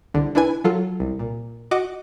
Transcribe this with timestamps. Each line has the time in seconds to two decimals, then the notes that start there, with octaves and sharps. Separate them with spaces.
0.14 C2 D3
0.35 D4 E4 B4 G#5
0.64 F#3 F4 A4
1.00 C2
1.19 A#2
1.71 F#4 D#5 F#5 D6